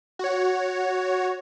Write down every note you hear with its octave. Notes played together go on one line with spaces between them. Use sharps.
F#4 C#5